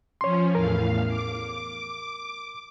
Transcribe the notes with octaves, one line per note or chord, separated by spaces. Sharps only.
F3 C#4 C#5 C6
E2 A2 A#4 F5
D6